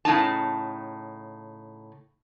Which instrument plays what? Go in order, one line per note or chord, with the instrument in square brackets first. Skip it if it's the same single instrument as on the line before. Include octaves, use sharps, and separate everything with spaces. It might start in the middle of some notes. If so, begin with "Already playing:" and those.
[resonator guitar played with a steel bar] A2 C#3 D#4 A5